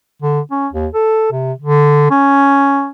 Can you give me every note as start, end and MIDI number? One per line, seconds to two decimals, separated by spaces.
0.22 0.40 50
0.51 0.67 61
0.73 0.87 39
0.94 1.31 69
1.32 1.53 48
1.59 2.09 50
2.11 2.90 61